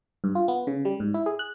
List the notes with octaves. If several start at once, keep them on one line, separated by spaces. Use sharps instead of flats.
G2
F4
B3
C#3
G3
G#2
E4
G#4
F#6